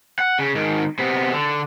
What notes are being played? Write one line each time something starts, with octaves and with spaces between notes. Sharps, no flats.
F#5
C#3
G#2 D#3
C3 B3
D3